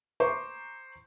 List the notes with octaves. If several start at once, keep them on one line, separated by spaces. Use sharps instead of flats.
C5 A#5 C#6 D6